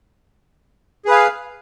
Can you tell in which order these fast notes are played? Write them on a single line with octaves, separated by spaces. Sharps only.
G#4 B4 F5